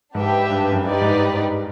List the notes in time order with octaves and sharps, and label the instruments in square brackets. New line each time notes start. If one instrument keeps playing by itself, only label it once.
[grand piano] G#2 [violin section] D4 G4 B4 E5 G5
[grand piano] G2
G2
F#2
[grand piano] G2 [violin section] D#4 G4 B4 D5
[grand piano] G#2